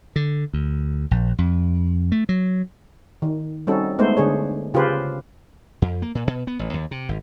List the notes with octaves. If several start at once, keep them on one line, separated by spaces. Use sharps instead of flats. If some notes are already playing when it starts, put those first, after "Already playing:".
D3
D2
A#1
F2
A3
F#3
D#3
G3 C4 C#4 D#4 F#4 A4
G#3 A3 B3 D#4 C5
D3 D4 G#4 C#5
C#3 F4 G4 G#4 B4 C5
F2
A#3
A#2
B2
B3
A1
D#2
C3
G#1